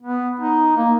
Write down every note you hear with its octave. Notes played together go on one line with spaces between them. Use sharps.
B3
D#4
A#3